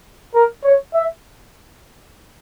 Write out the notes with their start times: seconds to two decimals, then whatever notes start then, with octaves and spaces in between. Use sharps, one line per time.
0.35 A#4
0.65 C#5
0.95 E5